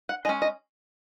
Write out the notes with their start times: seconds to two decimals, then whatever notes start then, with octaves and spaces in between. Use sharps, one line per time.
0.09 F#5
0.25 G#3 C#4 D#5
0.42 D#5